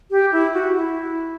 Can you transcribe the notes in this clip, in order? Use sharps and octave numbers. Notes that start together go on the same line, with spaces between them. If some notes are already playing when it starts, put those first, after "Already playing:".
G4
E4
F#4
E4